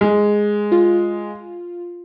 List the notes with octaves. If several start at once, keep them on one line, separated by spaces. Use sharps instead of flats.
G#3
F4